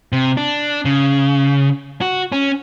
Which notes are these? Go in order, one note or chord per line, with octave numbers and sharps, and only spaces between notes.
C3
D4
C#3
F#4
C#4